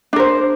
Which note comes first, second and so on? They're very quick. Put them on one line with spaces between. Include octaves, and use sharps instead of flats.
D4 A#4 C5